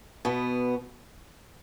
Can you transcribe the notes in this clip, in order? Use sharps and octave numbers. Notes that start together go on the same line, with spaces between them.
B2 B3